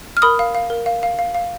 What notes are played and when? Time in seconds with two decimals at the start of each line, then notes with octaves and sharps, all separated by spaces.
0.17 F6
0.22 A#4 B5 D#6
0.39 F5
0.55 F5
0.70 A#4
0.86 F5
1.03 F5
1.19 F5
1.35 F5